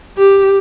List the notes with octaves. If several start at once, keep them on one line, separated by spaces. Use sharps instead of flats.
G4